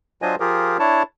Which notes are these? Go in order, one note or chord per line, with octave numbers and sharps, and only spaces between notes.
F#3 D4 F4 C5 D#5 G#5
F3 F4 G4 G#4 A#4
D4 E4 C#5 A5